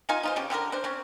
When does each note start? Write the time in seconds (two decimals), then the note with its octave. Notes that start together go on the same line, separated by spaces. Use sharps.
0.09 D#4 F4 F5 G#5
0.23 D#4 F4 C5
0.36 C#3 C#4 G4
0.50 D3 G4 A4 A#4
0.72 D4 C5
0.84 C4 C#4